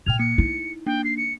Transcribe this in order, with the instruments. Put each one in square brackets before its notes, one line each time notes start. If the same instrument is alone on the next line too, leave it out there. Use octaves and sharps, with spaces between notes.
[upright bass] A#2 [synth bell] G5 F6 G#6 [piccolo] F7
[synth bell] A#3 [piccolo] C#7
[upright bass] D#4 [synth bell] E4
[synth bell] A#3 D4 [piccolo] G5
[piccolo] C7
C#7